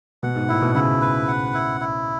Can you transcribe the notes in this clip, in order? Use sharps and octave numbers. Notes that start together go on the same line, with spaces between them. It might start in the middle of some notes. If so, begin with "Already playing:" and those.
B2 F#5
G#2
A2 E4
B2
C#3 E4
B4
F#5
E4
E4